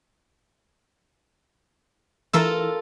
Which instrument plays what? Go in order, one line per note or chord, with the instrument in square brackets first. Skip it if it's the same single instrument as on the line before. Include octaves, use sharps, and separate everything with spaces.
[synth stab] E3 E6 [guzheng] F4 A4 A#4